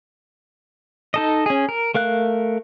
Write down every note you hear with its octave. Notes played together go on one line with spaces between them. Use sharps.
D#4 A4 D#5
C#4 G#4
A#4
A3 A#4 F5 F#6